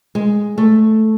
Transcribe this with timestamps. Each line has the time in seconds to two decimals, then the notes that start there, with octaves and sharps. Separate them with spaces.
0.15 G#3
0.58 A3